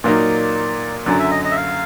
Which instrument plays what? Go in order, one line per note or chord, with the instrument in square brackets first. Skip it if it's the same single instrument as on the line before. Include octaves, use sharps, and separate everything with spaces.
[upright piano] A#2 F#3 A#3 D#4 [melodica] D5
[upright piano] F#2 D3 F#3 [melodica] D5
[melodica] E5
D#5
D#5
E5
F5